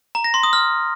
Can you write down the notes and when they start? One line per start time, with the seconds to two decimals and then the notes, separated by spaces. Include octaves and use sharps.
0.15 A#5
0.24 A#6
0.34 C6
0.43 D#6
0.53 F6